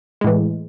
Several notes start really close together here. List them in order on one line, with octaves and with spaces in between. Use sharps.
G#3 A2 E3